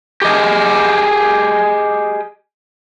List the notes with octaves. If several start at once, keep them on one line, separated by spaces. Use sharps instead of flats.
G4 G#4 D#5